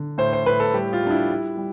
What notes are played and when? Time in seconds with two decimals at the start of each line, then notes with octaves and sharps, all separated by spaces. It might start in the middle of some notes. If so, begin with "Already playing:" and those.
Already playing: D3
0.18 A2 C5
0.33 C5
0.46 A2 B4
0.60 A4
0.74 G3 G4
0.93 F4
1.02 G3 D4
1.11 E4
1.29 G3
1.57 G3